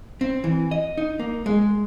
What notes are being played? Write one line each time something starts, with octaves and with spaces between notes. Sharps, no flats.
C4
E3
D#5
D#4
A#3
G#3